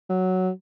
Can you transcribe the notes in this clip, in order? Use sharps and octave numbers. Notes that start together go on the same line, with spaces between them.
F#3